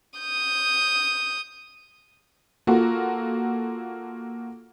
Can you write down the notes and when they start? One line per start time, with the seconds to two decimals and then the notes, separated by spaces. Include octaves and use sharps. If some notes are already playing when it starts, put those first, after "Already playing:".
0.19 D#6 G6
2.67 A#3 F4 F#4 A4